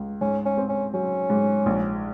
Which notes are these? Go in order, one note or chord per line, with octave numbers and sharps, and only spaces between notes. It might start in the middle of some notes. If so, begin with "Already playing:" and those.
Already playing: C#2
G#2 C#4
C#4
C4
C#4
F#3 C#4
G#2
A#1